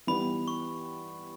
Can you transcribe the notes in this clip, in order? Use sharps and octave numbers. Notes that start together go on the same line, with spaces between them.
E3 G3 B3 B5
C#6